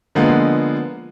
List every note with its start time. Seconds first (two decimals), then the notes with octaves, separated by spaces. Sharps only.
0.15 D3 F3 G#3 A#3 B3